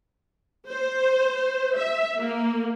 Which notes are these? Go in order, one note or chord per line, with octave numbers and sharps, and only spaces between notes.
C5
E5
A#3